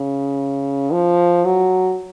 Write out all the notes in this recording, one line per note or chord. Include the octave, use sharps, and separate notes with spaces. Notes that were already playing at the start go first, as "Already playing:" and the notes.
Already playing: C#3
F3
F#3